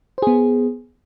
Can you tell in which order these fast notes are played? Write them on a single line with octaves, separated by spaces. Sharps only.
C5 G#4 B3